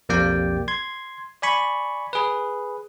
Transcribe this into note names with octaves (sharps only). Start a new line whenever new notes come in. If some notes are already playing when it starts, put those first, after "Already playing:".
B1 F2 A#3 G4 D5 G5
C6 G#6
D5 G#5 B5 C#6
G#4 B4